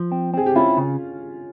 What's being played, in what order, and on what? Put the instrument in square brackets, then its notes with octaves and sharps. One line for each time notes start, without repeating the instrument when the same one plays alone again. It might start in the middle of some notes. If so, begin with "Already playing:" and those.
Already playing: [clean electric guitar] F3
C4
[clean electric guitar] C4 [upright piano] G#4
[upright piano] G4
[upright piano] C#4 F4 [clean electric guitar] E4
[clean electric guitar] C#3